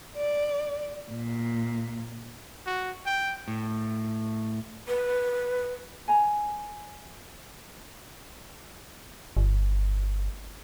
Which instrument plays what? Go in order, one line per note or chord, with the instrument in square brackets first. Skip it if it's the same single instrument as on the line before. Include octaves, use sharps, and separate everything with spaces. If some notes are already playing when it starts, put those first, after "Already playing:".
[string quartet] D5
A#2
[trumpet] F#4
G5
[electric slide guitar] A2
[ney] B4
[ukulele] G#5 A#5
[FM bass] G1